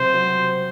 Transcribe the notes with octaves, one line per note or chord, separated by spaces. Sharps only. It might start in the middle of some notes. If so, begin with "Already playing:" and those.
Already playing: C3 F#3 C4 C5
F#3 C4